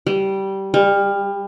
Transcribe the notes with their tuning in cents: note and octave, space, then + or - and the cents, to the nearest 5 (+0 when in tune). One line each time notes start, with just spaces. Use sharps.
G3 -15
G3 +30